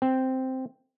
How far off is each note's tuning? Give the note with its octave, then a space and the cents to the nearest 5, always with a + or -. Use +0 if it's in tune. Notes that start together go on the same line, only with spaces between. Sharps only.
C4 -5